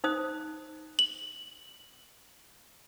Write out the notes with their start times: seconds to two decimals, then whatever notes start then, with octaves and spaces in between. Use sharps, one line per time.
0.04 D#4 C5 D#6
0.99 F#7